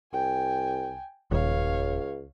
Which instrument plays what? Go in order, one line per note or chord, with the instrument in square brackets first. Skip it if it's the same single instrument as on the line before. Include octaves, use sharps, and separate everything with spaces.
[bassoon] C2 [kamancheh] G5 G#5
[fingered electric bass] D#1 [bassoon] C#2 [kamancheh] C#5 F5